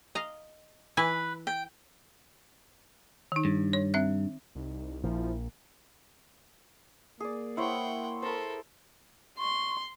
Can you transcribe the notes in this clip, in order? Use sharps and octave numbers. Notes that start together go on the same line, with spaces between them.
D#5 F5 A#5
E3 E4 B4 G#5
G5
D#3 D#4
G2
C#5
C4 E5 F#6
C2 D#4
A#1 A#2 F3 E4
A#3 G#4 D5
E4 C5 C#5 F#5 G5
A4 A#4 C5 B5
C6 C#6